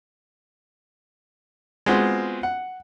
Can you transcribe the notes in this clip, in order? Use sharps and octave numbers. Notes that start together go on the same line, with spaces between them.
G#3 B3 C4 F4 F#4
F#5